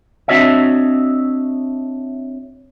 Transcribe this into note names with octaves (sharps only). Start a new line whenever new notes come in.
C4 D4 F#4 C#5 D#5 E5